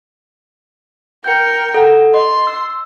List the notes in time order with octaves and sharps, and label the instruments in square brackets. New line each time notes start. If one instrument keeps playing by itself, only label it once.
[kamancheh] A#4 G5 [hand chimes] G6 C#7
[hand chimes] A4 F#5 A#5
[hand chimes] D#5 [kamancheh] C6
[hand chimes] E6